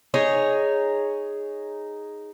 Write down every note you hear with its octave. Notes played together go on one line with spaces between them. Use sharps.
D#4 G#4 C#5